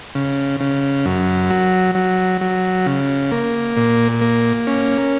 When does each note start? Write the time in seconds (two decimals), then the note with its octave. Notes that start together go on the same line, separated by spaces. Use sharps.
0.15 C#3
0.60 C#3
1.06 F#2
1.51 F#3
1.95 F#3
2.41 F#3
2.86 C#3
3.32 A#3
3.77 A#2
4.21 A#3
4.67 C#4